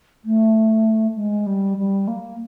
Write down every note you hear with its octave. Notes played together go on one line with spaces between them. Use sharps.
A3
G#3
G3
G3
A#3